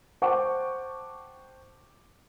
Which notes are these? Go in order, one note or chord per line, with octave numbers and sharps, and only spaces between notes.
C5 F#5 G5 A5 C#6 D6